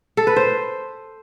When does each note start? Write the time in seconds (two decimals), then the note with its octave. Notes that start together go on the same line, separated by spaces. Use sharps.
0.17 A4
0.27 B4
0.36 C5